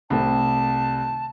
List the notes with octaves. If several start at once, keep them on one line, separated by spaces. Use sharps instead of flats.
C2 D#3 A3 C4 A5